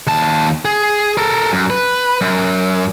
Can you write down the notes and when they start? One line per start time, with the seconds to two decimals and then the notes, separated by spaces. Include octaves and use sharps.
0.07 D#2 A5
0.65 G#4
1.17 A4 A#4
1.52 F#2
1.70 B4
2.21 F#2